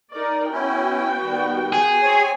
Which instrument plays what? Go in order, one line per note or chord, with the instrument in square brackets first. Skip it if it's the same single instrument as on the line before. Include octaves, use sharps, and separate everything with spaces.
[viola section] D#4 A#4 D5
[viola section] B3 F#4 G5 [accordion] C#4 E4
[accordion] D#3 G3
[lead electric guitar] G#4
[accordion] C4 C#5 G#5